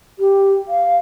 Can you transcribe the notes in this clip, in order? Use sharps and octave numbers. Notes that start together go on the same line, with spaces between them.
G4
F5